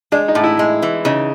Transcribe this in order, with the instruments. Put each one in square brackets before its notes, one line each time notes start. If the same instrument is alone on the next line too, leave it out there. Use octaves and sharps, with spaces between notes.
[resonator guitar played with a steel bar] G#3 [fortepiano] D4
[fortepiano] D#4
[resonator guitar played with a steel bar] A2
[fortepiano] E4
[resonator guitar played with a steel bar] G#3
E3
[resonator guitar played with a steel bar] C#3 [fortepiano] D#4